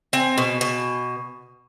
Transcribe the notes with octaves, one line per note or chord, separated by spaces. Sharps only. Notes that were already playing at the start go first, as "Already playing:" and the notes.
C4 G#5
B2
B2